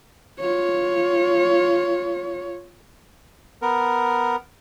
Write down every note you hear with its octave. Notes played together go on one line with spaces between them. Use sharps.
F4 C#5
B3 A#4